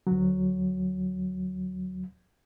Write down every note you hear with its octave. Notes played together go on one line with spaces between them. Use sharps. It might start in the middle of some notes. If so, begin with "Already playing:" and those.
D2 F#3